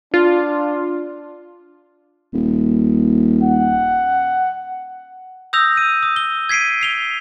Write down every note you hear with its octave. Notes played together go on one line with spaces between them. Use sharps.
D4 F4
D#1
F#5
D#6 E6 G6 A#6 F7
D#7
D#6
G7
G#6 B6 C7 D7 D#7
C7 F7 G7